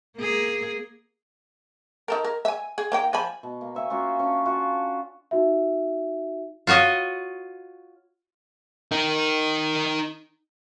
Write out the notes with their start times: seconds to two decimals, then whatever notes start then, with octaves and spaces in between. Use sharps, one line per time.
0.18 A#3 G#4
2.08 D#4 A4 A#4
2.24 A#4
2.45 E5 G#5
2.78 G#4
2.92 A#3 D#4 G5
3.13 F3 G#5 B5
3.43 B2
3.61 A#3
3.75 C#5 E5 G#5
3.90 A#3 C#4 F4 F#4
4.19 C#4 D4
4.45 F4 F#4 A4
5.31 D#4 F#4 E5
6.67 F4 F#4 C#5 D#5
8.92 D#4 A#4